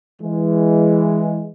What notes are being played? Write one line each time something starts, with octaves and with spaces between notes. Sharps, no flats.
E3 G#3